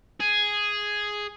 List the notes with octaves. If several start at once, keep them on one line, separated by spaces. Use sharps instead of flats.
G#4